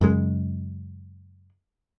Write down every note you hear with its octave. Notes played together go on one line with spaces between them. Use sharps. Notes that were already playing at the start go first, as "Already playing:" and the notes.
F#2 C#3 G#3